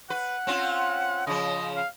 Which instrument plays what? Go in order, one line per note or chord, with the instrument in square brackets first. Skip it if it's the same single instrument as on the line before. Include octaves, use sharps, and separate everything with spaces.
[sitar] B4 [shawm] F#5
[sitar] C4 C#4 F4
[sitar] C#3 F3 [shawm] D#5
[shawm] F5